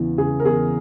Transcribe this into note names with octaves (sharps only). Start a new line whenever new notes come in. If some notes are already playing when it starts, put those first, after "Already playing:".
Already playing: E2 C#3 E3
C#3 G#4
A#4
E2 G#4